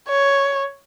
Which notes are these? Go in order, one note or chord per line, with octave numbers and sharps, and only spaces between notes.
C#5